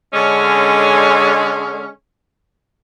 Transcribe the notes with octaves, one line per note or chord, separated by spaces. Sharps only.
D3 G#3 C#4